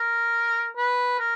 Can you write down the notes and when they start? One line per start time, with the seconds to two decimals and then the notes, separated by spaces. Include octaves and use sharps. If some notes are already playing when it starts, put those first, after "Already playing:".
Already playing: A#4
0.77 B4
1.19 A#4